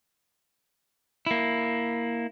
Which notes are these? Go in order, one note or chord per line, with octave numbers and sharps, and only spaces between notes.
A#3 E4